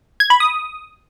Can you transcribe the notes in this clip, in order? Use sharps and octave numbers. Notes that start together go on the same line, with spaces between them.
G#6
B5
D#6